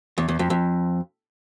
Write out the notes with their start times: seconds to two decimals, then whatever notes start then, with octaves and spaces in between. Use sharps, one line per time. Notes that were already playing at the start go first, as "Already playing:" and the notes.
0.18 E2
0.28 E2
0.39 F2
0.50 F2